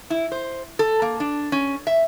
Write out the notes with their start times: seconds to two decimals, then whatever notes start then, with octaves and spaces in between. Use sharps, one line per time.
0.10 E4
0.32 C5
0.79 A4
1.02 A#3
1.20 D4
1.52 C#4
1.87 E5